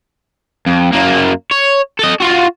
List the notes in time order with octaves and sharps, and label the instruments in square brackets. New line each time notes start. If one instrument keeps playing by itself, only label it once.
[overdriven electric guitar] F2
F#2 A#3
C#5
A4 D#5
F4 F#4